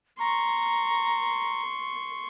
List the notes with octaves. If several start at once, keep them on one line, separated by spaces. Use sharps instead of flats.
A#5 C6 C#6